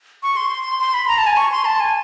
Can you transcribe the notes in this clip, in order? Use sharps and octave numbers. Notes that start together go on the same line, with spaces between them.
C#6
C6
C6
B5
A#5
A5
G#5
C#6
C6
A5
G#5